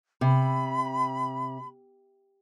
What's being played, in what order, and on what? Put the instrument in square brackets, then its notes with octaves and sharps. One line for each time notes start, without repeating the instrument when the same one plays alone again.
[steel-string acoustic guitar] C3 [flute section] B5